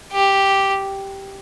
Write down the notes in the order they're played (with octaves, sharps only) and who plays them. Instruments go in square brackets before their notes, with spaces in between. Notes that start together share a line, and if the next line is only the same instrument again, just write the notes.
[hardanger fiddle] G4